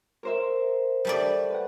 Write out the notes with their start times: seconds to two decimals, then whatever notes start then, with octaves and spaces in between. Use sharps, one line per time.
0.23 A#4 C5 E5
1.05 G3 A3 D5
1.50 B4 F#5